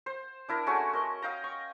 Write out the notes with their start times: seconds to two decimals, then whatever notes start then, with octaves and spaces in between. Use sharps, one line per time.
0.06 C5
0.49 D4 E4 A#4
0.66 G#3 A3 C#4 F#4
0.93 A#4 D#5
1.22 D#5 F5 G5 A#5
1.44 C#6